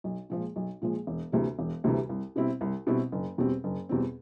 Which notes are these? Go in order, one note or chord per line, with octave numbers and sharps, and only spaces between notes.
B1
A#2 F3 G#3
B1
A#2 F3 G#3
E1
D2 C3 E3 G3
E1
D2 C3 E3 G3
C2
B2 G3 C4 E4
C2
B2 G3 C4 E4
F#1
E2 B2 G3 C4
F#1
E2 B2 G3 C4